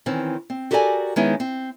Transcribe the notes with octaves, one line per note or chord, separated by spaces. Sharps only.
D#3 E3 C4 C#4
C4
F#4 G4 A4 A#4 D5 G#5
D#3 G#3 B3 C#4 D#4 E4
C4